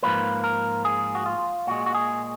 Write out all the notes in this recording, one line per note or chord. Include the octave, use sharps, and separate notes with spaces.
G#2 F3 A#3 B4
A#4
G#4
F#4
F4
A#2 G#3 F#4
F#4
G#4